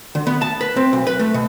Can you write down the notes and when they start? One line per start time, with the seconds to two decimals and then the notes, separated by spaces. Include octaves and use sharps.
0.15 D3
0.27 B3
0.42 A5
0.61 B4
0.76 C4
0.93 B1
1.07 B4
1.19 A3
1.34 B2